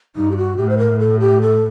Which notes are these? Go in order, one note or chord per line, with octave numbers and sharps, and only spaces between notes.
G2 D#4
G4
F#4
A2 G4
C5
A#4
A4
G4
A4